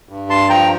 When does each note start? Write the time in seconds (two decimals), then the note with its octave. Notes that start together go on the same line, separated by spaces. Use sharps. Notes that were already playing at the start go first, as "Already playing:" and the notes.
0.09 G2
0.30 A5 C6
0.49 F3 G5 A#5